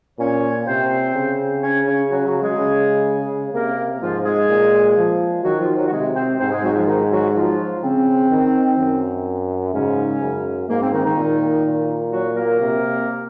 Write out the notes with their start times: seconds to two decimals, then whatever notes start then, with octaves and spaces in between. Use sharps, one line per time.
0.19 A#2 C#4 C#5
0.67 C3 C4 C5
1.15 C#3
1.62 C#4 C#5
1.87 C#4 C#5
2.10 F#3 F#4
2.26 F#3 F#4
2.42 G#3 G#4
2.58 C#3
3.53 C3 A#3 A#4
4.02 G#2 F3 F4
4.25 G#3 G#4
4.48 A#2
4.97 F3
5.44 D#3 F#3 F#4
5.60 F3 F4
5.76 F#3 F#4
5.87 F#4
5.92 C3 G#3 G#4
6.16 C4 C5
6.40 G#2 C4 C5
6.51 G#3 G#4
6.64 F#3 F#4
6.75 F3 F4
6.87 D#3 D#4
7.12 F#3 F#4
7.35 F3 F4
7.83 C#3 C4
8.31 D#3
8.78 F#2
9.74 G#2 C#3 C#4
10.22 F#2
10.69 G#2 A#3
10.81 C4
10.93 D#3 D#4
11.05 D#3 D#4
11.16 A#2
11.65 A#2
12.12 F#3 F#4
12.36 A#3 A#4
12.60 C3